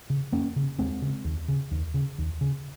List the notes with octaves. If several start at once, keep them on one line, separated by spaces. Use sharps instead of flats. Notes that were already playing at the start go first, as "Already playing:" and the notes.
C#3
F2 A#3 C#4
C#3
D#2 G#3 C4
C#3
D#2
C#3
D#2
C#3
D#2
C#3